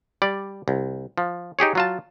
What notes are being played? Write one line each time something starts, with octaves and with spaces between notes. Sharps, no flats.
G3 D5
C2
F3
D#4 G4 G#4 C#5
F#3 F4 A5